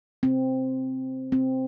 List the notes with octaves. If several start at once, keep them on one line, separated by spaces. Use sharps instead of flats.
C4
C4